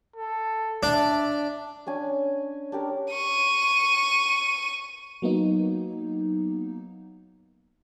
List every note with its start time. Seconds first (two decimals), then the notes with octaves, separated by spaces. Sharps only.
0.16 A4
0.83 D4 E5
1.86 C#4 D4 G#5
2.72 D4 G4 A#4
3.11 C#6 D#7
5.22 F#3 A#3 B3 D#4